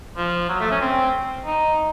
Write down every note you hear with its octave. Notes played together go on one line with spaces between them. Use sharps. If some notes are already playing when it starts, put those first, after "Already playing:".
F3
F#3
A3
C#4
C4
D#4